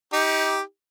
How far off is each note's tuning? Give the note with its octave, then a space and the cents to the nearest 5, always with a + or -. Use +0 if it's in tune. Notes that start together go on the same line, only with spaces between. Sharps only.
D#4 +30 G4 +0